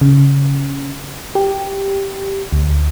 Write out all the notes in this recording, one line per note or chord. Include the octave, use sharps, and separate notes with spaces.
C#3
G4
D2